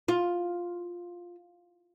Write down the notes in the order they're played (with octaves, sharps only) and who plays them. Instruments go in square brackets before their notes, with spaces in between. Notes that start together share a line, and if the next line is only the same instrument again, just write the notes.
[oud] F4